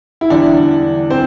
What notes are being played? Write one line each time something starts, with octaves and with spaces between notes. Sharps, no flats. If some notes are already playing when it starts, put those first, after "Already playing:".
E4
E2 D3 G3 D4
C4 C5